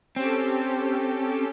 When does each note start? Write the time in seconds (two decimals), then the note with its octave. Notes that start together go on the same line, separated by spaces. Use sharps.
0.16 C4 C#4 G4 A4